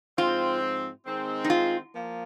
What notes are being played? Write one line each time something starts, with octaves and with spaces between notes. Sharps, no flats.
G#2 F3 C4 F4
D#3 G#3 C4
D#4
F4
F3 A#3